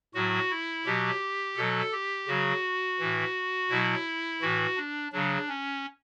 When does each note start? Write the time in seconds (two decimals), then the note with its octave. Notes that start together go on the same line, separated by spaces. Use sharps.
0.14 A2 F#3 F#4
0.50 E4
0.85 B2 F#3 G4
1.56 B2 F#3 A4
1.93 G4
2.28 C#3 F#3 F#4
2.99 A2 E3
3.70 B2 F#3 E4
4.41 A2 E3 F#4
4.77 D4
5.12 C#3 F#3 D4
5.48 C#4